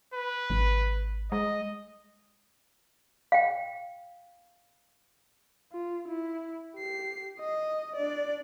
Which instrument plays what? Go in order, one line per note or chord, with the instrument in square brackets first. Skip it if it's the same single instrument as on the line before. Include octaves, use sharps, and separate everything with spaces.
[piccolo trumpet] B4
[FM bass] G#1
[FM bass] G#3 [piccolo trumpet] D#5
[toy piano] F5 G5
[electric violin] F4
E4
G4 C7
D#5
D4 D5